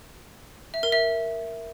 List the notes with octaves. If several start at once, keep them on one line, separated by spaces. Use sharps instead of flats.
E5
A#4
E5